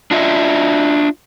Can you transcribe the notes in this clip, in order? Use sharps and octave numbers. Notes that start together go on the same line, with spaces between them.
D4 F4 D#5 E5